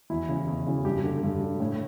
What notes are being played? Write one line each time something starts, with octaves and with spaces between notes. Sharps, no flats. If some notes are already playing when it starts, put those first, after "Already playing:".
E2 E4
C#3 E3
E2
C#3 E3
G2 G4
D3
G2
D3
A2